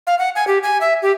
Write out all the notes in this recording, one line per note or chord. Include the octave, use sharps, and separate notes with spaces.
F5
F#5
G#5
G4
G#5
E5
G4